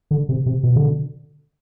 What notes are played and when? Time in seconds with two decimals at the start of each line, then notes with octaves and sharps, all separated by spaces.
0.11 D3
0.29 C3
0.46 C3
0.63 B2
0.76 D3